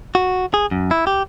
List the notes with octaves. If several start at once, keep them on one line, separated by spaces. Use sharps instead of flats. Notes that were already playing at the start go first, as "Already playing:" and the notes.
F#4
G#4
F#2
E4
G4